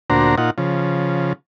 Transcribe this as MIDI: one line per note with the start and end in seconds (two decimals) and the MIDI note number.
0.10 0.35 38
0.10 0.35 46
0.10 0.35 62
0.10 0.35 66
0.10 0.35 72
0.10 0.35 82
0.38 0.50 46
0.38 0.50 63
0.38 0.50 65
0.38 0.50 78
0.58 1.33 49
0.58 1.33 53